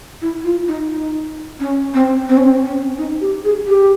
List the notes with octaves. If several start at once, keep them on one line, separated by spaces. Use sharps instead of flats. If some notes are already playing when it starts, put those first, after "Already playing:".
E4
F4
D#4
D#4
C#4
C4
C4
C#4
C4
C#4
D#4
G4
G#4
G4